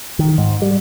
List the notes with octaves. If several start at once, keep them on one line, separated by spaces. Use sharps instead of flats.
D#3
G#2
G3